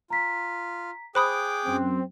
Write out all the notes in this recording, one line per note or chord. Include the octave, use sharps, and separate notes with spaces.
F4 A#5 B6
G#4 C5 G5 B5 D6 D#6 F#6
F#2 C4